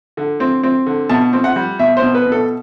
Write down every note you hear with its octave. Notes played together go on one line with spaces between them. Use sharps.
D3
C4
C4
D3
B2 A5
C4
F#5
G3
B2 E5
C5
B2
B4
B2
A4